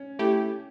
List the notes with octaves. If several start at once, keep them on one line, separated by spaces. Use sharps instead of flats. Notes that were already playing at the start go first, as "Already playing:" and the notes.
Already playing: C#4
A3 E4 G4